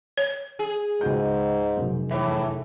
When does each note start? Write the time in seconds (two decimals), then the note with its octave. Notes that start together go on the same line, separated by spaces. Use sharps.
0.18 C#5
0.59 G#4
1.01 C#2 G#2 F#4 G6
1.77 F1 F#2
2.11 A2 E3 E5